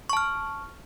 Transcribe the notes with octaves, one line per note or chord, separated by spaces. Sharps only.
A5 C#6 F6